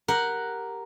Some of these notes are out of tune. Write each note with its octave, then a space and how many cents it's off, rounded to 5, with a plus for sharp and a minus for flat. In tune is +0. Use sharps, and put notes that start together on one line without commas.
G4 +10 A#4 +0 F#5 +0